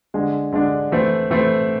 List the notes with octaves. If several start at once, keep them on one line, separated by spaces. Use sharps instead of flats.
D3 G#3 D4
D3 G#3 D4
E3 A3 C4
E3 A3 C4